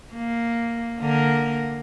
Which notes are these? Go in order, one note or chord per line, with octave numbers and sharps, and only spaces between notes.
A#3
D3 A#3 A#4